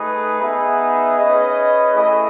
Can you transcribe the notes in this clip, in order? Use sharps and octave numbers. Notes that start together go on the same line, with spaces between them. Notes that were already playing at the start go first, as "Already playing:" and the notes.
Already playing: A3 D#4 G#4 B4
B3 D#4 G#4 B4 E5
C#4 G#4 B4 D#5
A3 E4 G#4 D#5